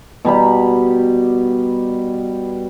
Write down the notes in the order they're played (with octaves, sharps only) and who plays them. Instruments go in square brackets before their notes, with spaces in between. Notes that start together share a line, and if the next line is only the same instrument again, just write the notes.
[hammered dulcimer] B2 G3 A#5 B5